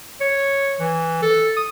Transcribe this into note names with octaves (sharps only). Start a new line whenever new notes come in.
C#5
E3
A4
D#6